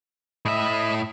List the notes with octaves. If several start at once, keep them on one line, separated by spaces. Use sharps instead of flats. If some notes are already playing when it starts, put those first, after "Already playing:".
A2 D#5 E5 B5